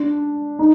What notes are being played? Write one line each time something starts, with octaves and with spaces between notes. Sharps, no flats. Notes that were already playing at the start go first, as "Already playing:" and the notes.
Already playing: D4
D#4